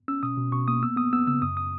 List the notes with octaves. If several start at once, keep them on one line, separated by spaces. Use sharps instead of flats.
C#4 E6
B2 D#6
B2
B2 C#6
A#3 D#6
B3 E6
B3 D#6
B3 E6
C#3 E6
F#2 D#6
D#6